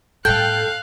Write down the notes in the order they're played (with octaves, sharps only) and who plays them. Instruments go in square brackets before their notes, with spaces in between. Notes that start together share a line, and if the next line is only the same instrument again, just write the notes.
[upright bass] A2 G3 [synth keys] A4 G5 [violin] F5 F#6 [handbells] G6